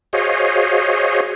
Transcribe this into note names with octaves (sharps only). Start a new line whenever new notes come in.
F#4 G#4 C5 C#5 D#5 F5